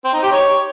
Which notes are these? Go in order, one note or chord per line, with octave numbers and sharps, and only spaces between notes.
C4
D#4
G4
C#5